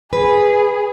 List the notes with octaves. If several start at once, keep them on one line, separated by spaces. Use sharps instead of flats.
G#4 B4